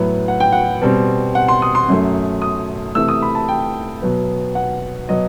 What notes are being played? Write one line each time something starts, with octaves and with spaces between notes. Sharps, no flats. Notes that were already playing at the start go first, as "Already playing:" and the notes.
Already playing: A2 F#3 B3
F#5
G5
F#5
B2 G3 C4
F#5
C6
D#6
C6
F#2 F#3 A3
D#6
C3 E3 A3 E6
D#6
B5
A5
G5
B2 F#3 B3
F#5
B2 F#3 B3 D#5